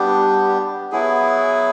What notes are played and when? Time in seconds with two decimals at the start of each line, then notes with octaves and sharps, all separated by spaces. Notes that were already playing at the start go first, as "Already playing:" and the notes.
Already playing: G3 B3 D4 G4
0.92 F#3 B3 E4 G#4